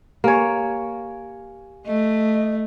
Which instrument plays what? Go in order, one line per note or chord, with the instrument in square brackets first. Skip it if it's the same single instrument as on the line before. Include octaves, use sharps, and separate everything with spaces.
[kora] A#3 C#5 [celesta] G4 G#5
[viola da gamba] A3 [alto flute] D#5